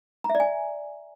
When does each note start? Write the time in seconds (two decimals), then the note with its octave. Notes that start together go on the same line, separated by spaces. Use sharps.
0.24 A#5
0.30 E5
0.35 D5
0.40 G#5